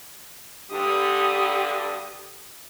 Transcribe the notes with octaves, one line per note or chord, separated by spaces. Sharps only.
G2 D3 G4 D#6